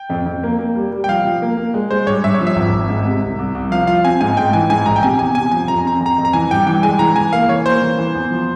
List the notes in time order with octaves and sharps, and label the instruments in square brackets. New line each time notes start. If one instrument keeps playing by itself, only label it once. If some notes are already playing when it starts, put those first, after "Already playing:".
Already playing: [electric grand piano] G5
[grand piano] F2
F2
A#3
A#3
G3
G3
[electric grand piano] G5
[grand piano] F3 [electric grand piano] F5
[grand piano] F3
A#3
A#3
G#3
[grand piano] G#3 [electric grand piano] C5
[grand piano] G2 [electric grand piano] C#5
[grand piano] G2 [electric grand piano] E5
[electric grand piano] C#5
[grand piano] F3
[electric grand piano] E5
[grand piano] G#1
G#1
G#2
C3
C2
C2
C2
[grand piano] F3 [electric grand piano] F5
[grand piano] F4 [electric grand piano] F5
[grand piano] C4 [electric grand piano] G#5
[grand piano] G#2 [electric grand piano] G#5
[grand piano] G#2 [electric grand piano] G5
[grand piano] E3 [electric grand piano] G#5
[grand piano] G#2 [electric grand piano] G#5
[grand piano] A#1 [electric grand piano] A#5
[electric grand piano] G5
[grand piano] C3 [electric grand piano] G#5
[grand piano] E2 [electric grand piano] G#5
[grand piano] C3 [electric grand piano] G#5
[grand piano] F3 [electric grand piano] G#5
[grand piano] F2 [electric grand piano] A#5
[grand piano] C4 [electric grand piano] A#5
[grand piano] F2
[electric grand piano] A#5
[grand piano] F2
[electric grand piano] A#5
[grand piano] E3 [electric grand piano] G#5
[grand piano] G2 [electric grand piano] G5
[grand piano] E3 [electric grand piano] G5
[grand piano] G#3 [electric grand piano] G#5
[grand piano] E3 [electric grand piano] A#5
[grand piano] E3 [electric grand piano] G#5
[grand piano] A#3 [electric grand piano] F5
[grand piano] E3 [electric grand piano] C#5
[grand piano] A#3 [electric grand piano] C5
[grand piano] E3
E3
E2
F3